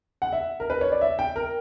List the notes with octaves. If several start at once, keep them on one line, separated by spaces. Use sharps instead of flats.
F#5
E5
A#4
B4
C#5
D5
E5
G5
A#4